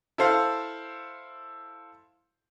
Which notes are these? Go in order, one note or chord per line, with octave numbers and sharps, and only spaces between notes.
E4 A4 C5 F5